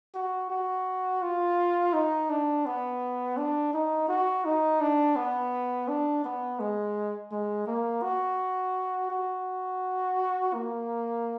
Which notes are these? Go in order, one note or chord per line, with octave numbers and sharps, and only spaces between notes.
F#4
F#4
F4
D#4
D4
B3
D4
D#4
F#4
D#4
D4
B3
D4
B3
G#3
G#3
A#3
F#4
F#4
A#3